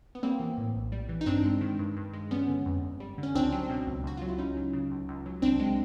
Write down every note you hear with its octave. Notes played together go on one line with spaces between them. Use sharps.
B3
G3 A#3 C4
E3
A2
A#1
G3
E3
D#4
G2 C4 D4
G#3
D#3
G2
G2
G#3
G3 B3 C#4
D3
F2
G1
G3
D3
C#4
C#2 C4 D4
F#3
B2
C#2
C#2 F#4
F#3 F4
E4
C#2 C#4 D#4
F#3
C#3
C#2
C#2
F#3
C2 C4 D4
G#3